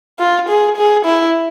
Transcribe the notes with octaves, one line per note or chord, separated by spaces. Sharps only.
F4
G#4
G#4
E4